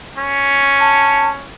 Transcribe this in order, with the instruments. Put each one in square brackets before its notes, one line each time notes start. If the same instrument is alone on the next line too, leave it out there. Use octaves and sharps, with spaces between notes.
[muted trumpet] C#4
[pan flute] A5